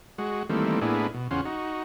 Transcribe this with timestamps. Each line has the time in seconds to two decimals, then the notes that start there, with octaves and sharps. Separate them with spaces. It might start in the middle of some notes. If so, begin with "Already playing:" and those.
0.18 G#3 F#4
0.50 D#3 E3 G3 A3 A#3 C4
0.81 A2 A#3 B3 D4 E4 G#4
1.14 B2
1.31 E2 C#3 C#4 F4 C5 F#5
1.45 D#4 F#4